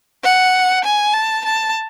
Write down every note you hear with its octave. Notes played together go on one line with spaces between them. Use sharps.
F#5
G#5
A5
A5